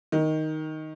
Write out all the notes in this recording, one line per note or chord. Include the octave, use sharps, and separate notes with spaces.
D#3